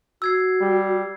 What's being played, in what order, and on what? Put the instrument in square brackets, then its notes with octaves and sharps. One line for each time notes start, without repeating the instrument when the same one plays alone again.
[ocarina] F#4 [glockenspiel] E6 G#6 C7
[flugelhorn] G3